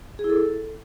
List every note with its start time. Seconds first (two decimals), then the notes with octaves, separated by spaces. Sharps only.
0.19 G#4
0.24 E4
0.30 A4